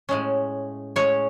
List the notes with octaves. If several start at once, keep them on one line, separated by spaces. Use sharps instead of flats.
A2 G#3 C#4
A2 G#3 C#4 C#5